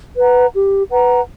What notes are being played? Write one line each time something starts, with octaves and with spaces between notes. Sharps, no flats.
B4 F#5 A#5
G4
B4 F#5 A#5